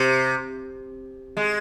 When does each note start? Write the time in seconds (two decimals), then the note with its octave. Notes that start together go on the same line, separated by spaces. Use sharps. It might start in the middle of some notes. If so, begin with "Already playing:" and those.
Already playing: C3
1.37 G#3